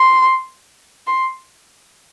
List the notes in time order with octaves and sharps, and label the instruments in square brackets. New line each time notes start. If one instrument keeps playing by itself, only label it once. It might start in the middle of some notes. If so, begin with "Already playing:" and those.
Already playing: [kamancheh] C6
C6